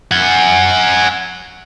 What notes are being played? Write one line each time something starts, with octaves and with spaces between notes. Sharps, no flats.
F#5 G#5